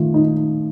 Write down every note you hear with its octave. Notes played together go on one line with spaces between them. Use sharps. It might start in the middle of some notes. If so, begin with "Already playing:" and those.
Already playing: D#3 F3 A3
D#4